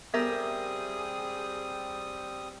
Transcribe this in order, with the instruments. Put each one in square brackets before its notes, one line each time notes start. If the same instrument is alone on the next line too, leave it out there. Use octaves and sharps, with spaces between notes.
[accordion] G3 C4 D#6 [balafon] B3 [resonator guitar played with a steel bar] G4 A#4 E5 [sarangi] G#4